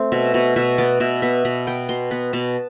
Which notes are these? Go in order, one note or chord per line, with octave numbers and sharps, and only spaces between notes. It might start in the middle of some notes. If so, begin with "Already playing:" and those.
Already playing: A3 C4
B2 E5
B2
B2 E5
B3 D5
B2 E5
B3 E5
B2 B5
B3 G5
B2 C6
B3 B5
B2 A5